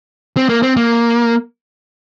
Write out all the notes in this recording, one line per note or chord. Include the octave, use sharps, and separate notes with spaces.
C4
A#3
C4
A#3